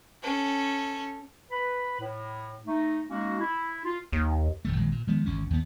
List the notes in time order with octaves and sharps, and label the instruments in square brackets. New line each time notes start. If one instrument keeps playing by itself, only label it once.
[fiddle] C#4 A4
[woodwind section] B4 B5
A2
A3 D#4
G#3 A#3 C#4 D#4 F#4
E4
F4
[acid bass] D#2
[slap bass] E1 D#3 A3
A#1 D#3 F3 G#3
A#2
D#3 F3 G#3 B3
G#1 D2 C#4
D#2 B3